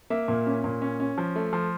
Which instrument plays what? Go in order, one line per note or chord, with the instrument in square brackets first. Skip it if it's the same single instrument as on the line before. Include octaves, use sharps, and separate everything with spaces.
[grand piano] A#3 E5
A#2
C#4
A#2
C#4
C#4
F3
A3
F3